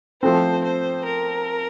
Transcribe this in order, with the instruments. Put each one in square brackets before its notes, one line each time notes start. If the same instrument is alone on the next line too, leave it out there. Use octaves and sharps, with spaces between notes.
[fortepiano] F3 A3 C4 [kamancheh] C5
[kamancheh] C5
A#4